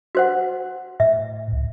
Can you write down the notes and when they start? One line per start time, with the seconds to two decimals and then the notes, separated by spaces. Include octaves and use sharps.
0.15 F#4 C5 F#5
1.00 A2 E5
1.53 C#2